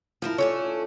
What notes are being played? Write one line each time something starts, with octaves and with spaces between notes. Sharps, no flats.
F3 E4 F4 A#4 A5
A3 C#4 D4 C#5